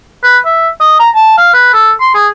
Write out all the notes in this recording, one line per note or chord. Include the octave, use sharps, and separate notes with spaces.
B4
E5
D#5
A#5
A5
F5
B4
A4
C6
G#4